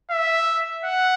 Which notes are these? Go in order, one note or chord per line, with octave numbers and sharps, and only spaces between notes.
E5
F#5